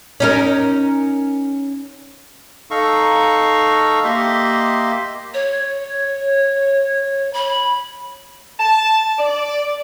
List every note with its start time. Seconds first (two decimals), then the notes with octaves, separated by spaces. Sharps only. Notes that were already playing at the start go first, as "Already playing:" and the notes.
0.20 C#4 D#4 A#4
2.71 D#4 A4 F5 A#5 C#6
4.04 A#3 G4 D#5 E5 C6
5.34 C#5
7.33 B5
8.59 A5
9.19 D5